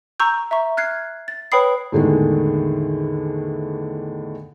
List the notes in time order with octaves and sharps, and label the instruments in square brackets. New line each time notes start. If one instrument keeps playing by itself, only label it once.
[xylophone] A#5 C#6 E6 G6
E5 A#5 C#6
F6 F#6 G#6 C7
A6
B4 C#5 G5 B5 D#6 C7
[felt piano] E2 A2 D3 D#3 G#3